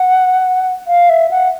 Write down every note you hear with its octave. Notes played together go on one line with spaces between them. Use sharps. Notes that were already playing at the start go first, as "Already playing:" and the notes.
Already playing: F#5
F5
E5
F#5